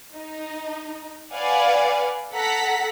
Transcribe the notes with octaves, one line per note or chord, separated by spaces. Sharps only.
D#4
B4 D5 F5 F#5 G#5
A4 F#5 A#5 B6